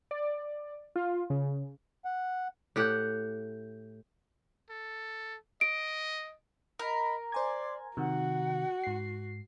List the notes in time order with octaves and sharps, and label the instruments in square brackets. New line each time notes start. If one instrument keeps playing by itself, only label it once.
[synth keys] D5
F4
C#3
[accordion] F#5
[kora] A2 G4 F#5
[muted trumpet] A4
[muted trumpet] D#5 [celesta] D7
[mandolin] A#4 [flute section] D#5 B5
[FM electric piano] C5 G#5 G#6 [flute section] D5 C6 D6
[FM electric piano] C3 D#3 [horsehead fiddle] F#4 [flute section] F#5
[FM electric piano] G#2 C7